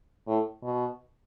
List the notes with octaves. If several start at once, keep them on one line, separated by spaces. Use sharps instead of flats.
A2
B2